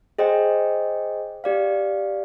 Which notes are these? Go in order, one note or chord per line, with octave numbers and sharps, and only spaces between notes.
G#4 C5 D#5 G5
G4 D5 F5